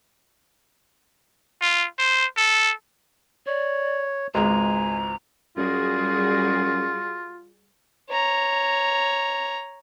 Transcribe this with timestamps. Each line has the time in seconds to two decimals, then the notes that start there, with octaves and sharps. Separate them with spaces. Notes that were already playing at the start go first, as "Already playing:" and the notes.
1.62 F4
1.99 C5
2.37 A4
3.47 C#5 D5
4.35 G#1 C#2 G#3 G#5 A#5
5.57 F#2 G3 F4 F#4 G#4
8.10 C#5 A#5